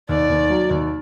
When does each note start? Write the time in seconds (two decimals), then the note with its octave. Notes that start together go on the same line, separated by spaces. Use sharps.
0.09 D#2 D5
0.29 D#2
0.50 F#3
0.70 D#2